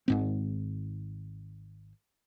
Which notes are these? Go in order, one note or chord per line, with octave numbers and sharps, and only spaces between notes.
G#1 G#2 C4